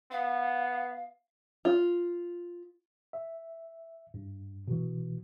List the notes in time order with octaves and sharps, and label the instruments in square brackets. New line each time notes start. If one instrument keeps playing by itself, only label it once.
[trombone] B3 [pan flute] F5
[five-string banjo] F4
[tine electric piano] E5
G2
B2 E3